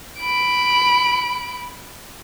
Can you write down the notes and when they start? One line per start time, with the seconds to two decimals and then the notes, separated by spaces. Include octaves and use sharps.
0.20 B5 D7